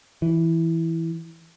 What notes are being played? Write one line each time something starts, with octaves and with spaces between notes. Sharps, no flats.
E3